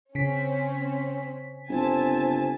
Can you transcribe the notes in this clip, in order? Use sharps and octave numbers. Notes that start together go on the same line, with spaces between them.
C#3 C4 C#4 B6
G1 C4 G#5 A5